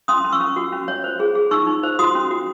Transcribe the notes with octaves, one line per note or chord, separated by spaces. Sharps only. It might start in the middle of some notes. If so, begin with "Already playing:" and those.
C#4 C6 D#6
C#4
C#6 E6
C#4
F#4
C#4
C#5
C5
G#4
G#4
D#4 C#6 E6
D#4
C5
F#4 C6 D#6
C#4
F#4